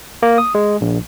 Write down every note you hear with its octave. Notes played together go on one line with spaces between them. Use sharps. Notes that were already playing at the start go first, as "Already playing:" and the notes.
A#3
D#6
G#3
A#1